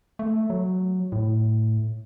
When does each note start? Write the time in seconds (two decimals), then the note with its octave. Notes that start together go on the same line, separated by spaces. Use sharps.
0.19 A3
0.50 F#3
1.12 A2